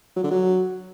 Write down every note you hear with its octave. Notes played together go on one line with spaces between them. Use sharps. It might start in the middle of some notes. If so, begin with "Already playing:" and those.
F#3
D3
F#3